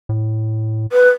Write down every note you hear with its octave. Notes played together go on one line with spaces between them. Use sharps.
A2
B4